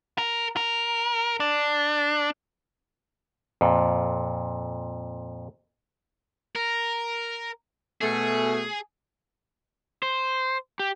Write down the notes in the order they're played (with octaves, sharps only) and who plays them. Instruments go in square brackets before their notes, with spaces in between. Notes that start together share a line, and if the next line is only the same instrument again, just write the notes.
[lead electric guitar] A#4
A#4
D4
[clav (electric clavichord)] F2 A#2
[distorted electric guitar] A#4
[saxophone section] B2 A3 [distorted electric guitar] G#4
[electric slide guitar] C5
G4